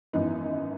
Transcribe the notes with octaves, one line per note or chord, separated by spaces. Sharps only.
G#1 F#2 E3 B3 D#4